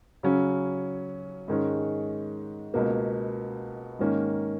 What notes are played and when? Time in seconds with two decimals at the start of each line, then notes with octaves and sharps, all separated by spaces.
0.23 C#3 F#3 C#4
1.48 G#2 D#3 G#3 C#4
2.74 C#2 B2 A#3
3.99 G#2 D#3 A#3 C#4